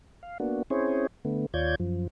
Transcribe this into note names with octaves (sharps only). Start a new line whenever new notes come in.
F5
A#3 B3 D4 F#4
C4 C#4 E4 G#4 C5 C#5
D3 A3 B3
D#2 F4 C#5 D5 G6 G#6
F#2 F3